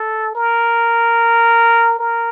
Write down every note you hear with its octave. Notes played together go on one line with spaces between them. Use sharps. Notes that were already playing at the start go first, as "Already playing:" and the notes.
Already playing: A4
A#4
A#4